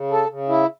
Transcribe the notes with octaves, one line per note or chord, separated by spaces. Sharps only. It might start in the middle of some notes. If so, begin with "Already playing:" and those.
Already playing: C#3
A4
C#3
E4